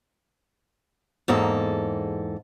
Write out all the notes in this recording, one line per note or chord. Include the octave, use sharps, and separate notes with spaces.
E2 G#2 A#3 A4